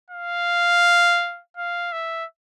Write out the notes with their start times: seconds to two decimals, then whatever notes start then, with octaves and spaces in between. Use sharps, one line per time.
0.10 F5
1.57 F5
1.93 E5